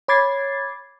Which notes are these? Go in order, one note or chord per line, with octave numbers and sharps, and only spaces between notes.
C#5 B5 D6 G#6 A6 C7